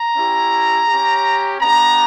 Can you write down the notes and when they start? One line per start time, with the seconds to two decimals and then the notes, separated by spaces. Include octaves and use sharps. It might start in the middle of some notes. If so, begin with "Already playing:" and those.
Already playing: A#5
0.16 C#4 E4 G4
0.88 G4
0.93 C#4
1.60 B3 D4 G4 A#5